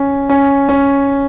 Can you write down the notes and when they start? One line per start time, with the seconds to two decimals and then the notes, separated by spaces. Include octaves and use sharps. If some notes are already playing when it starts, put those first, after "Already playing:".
Already playing: C#4
0.29 C#4
0.69 C#4